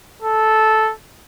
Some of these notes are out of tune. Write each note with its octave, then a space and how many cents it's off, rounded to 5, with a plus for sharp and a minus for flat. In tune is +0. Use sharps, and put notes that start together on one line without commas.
A4 -10